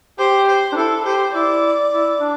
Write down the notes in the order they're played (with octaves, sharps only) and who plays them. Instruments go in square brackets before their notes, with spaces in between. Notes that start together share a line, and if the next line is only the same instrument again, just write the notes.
[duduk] G4 [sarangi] C5
[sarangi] C5
[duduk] D4
[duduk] E4 [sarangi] A4
[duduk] G4 [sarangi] C5
[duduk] E4 [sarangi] D5
[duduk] E4
D4